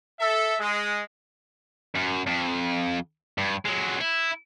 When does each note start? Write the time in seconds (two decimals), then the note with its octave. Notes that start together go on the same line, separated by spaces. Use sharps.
0.20 A4 E5
0.59 G#3
1.96 F#2
2.27 F2
3.38 G2
3.65 F#3 G#3
4.01 E4